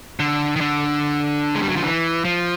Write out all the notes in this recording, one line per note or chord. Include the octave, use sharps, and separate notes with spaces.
D3
D#3
D3
G#3
G3
F#3
F3
E3
F3